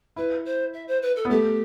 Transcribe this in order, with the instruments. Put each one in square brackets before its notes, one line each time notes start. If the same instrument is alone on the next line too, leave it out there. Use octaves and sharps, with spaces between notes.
[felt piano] E4 [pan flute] B4
[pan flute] C5
E5
C5
B4
A4
[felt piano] B3
[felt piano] A3 [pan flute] G4